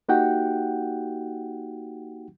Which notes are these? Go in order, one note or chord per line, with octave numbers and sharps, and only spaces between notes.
A#3 D#4 F#4 G4 F#5 G5